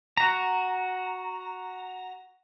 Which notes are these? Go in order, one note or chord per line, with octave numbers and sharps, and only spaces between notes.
F#4 A#5